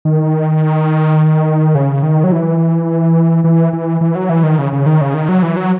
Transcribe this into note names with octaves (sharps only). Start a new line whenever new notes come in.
D#3
C#3
D#3
F#3
E3
E3
E3
E3
F#3
E3
D#3
C#3
C#3
D#3
C#3
D#3
F#3
E3
F#3